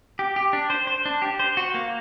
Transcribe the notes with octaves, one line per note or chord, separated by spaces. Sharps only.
G4
G4
D4
C5
C5
D4
G4
C5
F#4
A#3